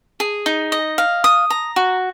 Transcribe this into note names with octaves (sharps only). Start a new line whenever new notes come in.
G#4
D#4
D#5
F5
D#6
A#5
F#4